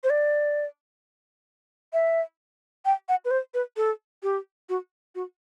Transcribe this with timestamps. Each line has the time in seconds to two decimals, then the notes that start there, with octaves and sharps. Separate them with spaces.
0.04 C5
0.10 D5
1.93 E5
2.85 G5
3.09 F#5
3.25 B4
3.31 C5
3.54 B4
3.77 A4
4.23 G4
4.69 F#4
5.15 F#4